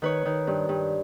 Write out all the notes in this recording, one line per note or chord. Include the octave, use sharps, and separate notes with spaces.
D#3 B4 C#5
D#3
G2
G2